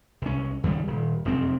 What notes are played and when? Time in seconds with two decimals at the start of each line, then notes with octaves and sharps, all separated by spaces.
0.22 C2 C#4
0.63 D#2 C#3 G3
0.87 D#1
1.25 F1 F#2 C4